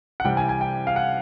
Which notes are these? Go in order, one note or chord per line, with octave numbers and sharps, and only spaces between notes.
F#5
C2 C3 E3 G3 G5
G#5
G#5
G5
F5
F#5